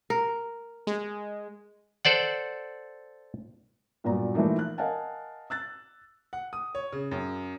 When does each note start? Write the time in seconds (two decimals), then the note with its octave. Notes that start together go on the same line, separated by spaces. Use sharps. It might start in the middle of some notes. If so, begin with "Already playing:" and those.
0.10 A#4
0.87 G#3
2.05 A4 C5 D5 F#5
4.04 G2 A#2 F#3 B3 D5 A#5
4.34 E3 F3 A3 A#3 D#4
4.59 F#6
4.78 A#4 D#5 F5 F#5 G#5 A5
5.50 E6 F#6 A6
6.33 F#5
6.53 D#6
6.75 C#5
6.93 C#3
7.11 F#2